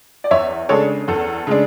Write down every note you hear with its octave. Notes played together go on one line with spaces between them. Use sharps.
D5
E2 C#5 E5
C#3 G#3 D4 A4 C#5
E2 A4
C#3 G#3 D4